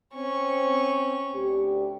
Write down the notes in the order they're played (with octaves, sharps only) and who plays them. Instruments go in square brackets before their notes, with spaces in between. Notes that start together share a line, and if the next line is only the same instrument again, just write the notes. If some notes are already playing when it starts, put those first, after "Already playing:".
[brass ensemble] C4 [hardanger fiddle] C#4 C#6
[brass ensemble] D2 G4